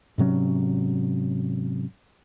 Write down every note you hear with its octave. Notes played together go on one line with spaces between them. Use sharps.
G#2 C3 F#3 C#4